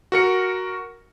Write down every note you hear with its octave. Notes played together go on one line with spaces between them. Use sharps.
F#4 A#4 C#7